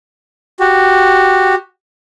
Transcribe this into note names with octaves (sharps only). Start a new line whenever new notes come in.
F#4 G4